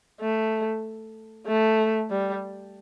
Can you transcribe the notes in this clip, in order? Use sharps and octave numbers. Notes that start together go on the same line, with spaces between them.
A3
A3
G3